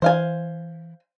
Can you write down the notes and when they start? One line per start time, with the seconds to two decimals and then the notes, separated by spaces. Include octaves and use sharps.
0.02 E3 C5 F5 G#5